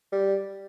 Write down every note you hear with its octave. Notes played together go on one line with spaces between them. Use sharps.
G3